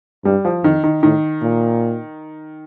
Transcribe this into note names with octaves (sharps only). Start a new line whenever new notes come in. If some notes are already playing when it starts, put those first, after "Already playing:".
G2 G3
F3
F2 D#3
D#3
A2 D#3
A#2